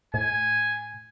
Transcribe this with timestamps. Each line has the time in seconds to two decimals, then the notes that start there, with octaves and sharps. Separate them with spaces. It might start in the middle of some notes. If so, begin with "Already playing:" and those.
0.14 A2 G#5